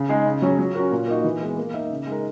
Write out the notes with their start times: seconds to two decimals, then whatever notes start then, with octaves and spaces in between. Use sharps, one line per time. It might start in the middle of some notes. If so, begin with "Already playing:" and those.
Already playing: C#3
0.09 G#3 D#4 G#4
0.26 C#3
0.42 F#3 C#4 G#4
0.59 F#3
0.75 C#4 F#4 A#4
0.91 A#2
1.08 A#3 D#4 F#4
1.24 E3
1.41 G#3 B3
1.58 A#3
1.74 D#4 A#4 E5
1.90 C#3
2.07 G#3 D#4 A#4